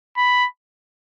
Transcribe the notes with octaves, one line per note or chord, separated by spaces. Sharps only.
B5